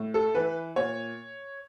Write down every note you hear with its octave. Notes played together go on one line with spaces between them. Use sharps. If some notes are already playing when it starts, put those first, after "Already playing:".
Already playing: A2
A4
E3 B4
A#2 C#5